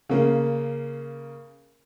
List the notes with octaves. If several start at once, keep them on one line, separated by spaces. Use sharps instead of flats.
C#3 A#3